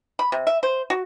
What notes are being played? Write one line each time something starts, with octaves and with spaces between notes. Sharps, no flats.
B5
C3
E5
C5
F#4